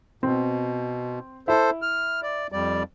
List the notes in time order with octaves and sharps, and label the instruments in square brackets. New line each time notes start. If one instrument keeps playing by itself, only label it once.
[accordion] B2 [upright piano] C4
[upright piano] E4 [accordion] A4 C5
[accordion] F6
D5
F2 G3 D5